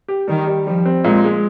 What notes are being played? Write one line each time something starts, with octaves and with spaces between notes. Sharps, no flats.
G4
D#3 G3
G3
F3 G3
C4
A#2 G#3
G#3